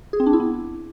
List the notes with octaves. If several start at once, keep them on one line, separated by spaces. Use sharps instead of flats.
G#4
C4
D4
E4
B3